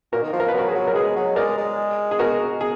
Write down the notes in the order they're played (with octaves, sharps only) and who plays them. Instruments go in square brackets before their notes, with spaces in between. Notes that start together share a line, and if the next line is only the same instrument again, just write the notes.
[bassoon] A#2 [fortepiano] F#4 A#4
[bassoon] D#3
F3
[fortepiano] A#4
B4
[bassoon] F#3 [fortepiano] F#4 A#4
[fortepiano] G#4 B4
[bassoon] F#3
[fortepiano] A#4
[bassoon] G#3 [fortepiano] G#4 B4
[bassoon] F#3
[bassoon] G#3 [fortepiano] A#4 D5
[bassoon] G#3
[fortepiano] G#4
F#4 A#4
G#4